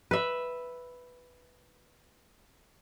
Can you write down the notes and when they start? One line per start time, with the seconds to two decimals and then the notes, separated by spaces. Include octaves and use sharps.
0.11 B4 E5